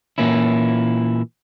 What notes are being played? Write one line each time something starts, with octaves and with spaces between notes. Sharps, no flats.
A#2 E3 A#3 C#4 E4